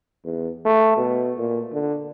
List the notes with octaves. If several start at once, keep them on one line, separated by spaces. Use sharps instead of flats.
E2
A3
B2
A#2
D3